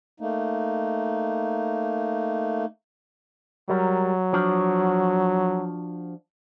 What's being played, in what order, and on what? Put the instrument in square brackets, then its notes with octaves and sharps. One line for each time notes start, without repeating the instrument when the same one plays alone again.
[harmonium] A3 A#3 D#4
[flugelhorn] F#3 [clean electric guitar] G3 A#4
[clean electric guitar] F3 D4 F#4